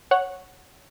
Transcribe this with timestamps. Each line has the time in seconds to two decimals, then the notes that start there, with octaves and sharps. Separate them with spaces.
0.11 C#5 F#5